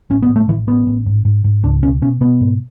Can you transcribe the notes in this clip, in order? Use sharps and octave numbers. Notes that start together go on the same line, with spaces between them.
A1 C#4
B3
A1
A3
A1 E3
A1 B3
A1
G#2
G#2
G#2
C#2 D4
B2 C#4
B2 C#4
B2 B3
G#2